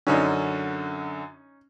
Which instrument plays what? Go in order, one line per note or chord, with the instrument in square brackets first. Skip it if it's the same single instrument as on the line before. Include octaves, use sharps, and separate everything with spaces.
[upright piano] F#2 D3 F#3 [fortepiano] C#4 D#4